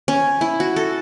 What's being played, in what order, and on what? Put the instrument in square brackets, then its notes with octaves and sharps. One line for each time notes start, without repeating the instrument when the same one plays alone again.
[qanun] C#4
E4
F#4
A4